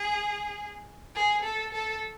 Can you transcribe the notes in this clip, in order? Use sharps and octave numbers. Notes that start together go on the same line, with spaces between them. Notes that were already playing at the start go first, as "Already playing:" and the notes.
Already playing: G#4
G#4
A4
A4